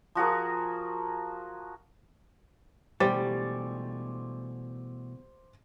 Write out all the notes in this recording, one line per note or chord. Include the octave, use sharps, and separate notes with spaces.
F3 F#4 G#4 A#4
B2 E3 G3 A3 C5 D6 A6